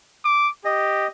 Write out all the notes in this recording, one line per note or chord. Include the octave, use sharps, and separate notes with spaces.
D6
G4 D#5